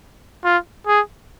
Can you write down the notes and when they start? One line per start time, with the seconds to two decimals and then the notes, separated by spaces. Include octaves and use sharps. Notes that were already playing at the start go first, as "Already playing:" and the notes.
0.44 F4
0.87 G#4